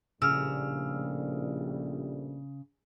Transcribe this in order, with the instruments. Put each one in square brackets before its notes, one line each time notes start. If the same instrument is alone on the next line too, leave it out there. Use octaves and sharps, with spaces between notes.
[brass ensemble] A#1 A2 G3 [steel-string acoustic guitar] C#3 [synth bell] E6 F6